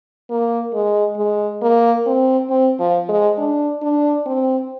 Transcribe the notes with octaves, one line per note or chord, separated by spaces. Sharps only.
A#3
G#3
G#3
A#3
C4
C4
F3
G#3
D4
D4
C4